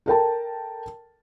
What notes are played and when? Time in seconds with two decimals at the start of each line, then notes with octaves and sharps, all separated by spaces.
0.06 A4 A#4 G5 A5